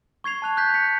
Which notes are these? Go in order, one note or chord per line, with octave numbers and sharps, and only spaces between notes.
C#6 G#6 C7 F7
A5 F#6 F7
F#6 G6 B6
G6 B6 C#7